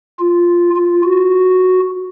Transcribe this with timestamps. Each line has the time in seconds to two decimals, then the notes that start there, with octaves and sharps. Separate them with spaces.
0.19 F4
0.76 F4
1.04 F#4